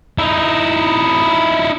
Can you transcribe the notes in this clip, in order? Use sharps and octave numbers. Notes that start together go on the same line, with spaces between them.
D#4 E4